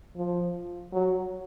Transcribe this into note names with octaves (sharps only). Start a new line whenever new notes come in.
F3
F#3